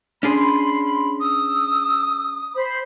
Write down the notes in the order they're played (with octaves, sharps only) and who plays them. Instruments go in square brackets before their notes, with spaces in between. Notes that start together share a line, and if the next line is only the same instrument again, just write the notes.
[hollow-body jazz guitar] C#4 D4 G#4 [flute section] B5 C6
[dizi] D#6 [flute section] E6
[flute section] C5 B5